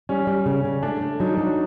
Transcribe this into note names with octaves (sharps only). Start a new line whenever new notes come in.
G3 C#4
G3
C#3
C#3
A3 D4
A3
F#3 D#4
F#3 D4